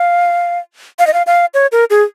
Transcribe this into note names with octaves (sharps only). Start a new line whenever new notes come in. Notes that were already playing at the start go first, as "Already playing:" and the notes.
Already playing: F5
F5
D#5
F5
F5
C#5
A#4
G#4